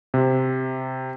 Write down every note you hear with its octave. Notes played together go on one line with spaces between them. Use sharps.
C3